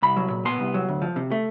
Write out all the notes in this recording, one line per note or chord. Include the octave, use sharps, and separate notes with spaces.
C2 B5
F#3
A#2
B3 C6
C2
F#3
D2
F3
C3
A3